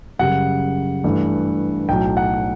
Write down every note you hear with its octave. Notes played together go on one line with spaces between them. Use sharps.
F#2 C#3 G3 F#5
G2 E3 A3
B1 A2 F#3 G5
F#5